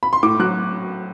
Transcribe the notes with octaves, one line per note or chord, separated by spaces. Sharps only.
B5
C6
A2 D6
F#3 F#6